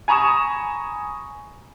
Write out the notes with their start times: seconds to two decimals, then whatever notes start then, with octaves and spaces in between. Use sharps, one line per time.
0.08 G#5 A#5 B5 C#6 D#6 E7